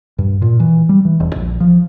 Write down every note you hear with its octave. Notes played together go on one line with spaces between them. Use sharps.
G2
A#2
E3
G3
E3
E1
A#1
F3